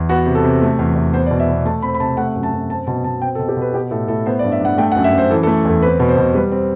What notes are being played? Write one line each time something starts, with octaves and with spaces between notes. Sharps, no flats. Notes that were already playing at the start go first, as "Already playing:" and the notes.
Already playing: E2
B3 F#4
C3
A4
C3
A3
E2
E2
B3 C5
D5
B2
E5
B2
A3 A5
C4 B5
B5
C3 A5
A3 F#5
F#2
A5
F#2
C4 A5
B2 A5
B2 A5
C4 G5
A4
B2
G4
B2 B4
B3 G4
A2 A4
A2 A4
B3 C5
D5
G2
E5
G2 F#5
A3 G5
F#5
F#2
E5
F#2 C5
E3 A4
A4
A3
E2 A4
C4 B4
B2
C5
B2
G3 B4
C4